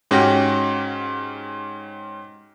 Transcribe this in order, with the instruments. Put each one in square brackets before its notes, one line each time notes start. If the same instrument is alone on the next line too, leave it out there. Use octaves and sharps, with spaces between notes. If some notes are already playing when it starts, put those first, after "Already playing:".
[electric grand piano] G#2 C#4 F#4 G4 G5 A#6